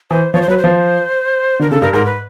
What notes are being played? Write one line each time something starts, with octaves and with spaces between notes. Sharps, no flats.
E3 C5
F3 C#5
C5
F#3 B4
C5
F3
D3 A#4
C#3 A4
G2 A#4
G#2 A#4
B4